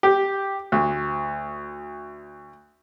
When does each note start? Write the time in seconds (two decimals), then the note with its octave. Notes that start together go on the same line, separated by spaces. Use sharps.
0.03 G4
0.72 D2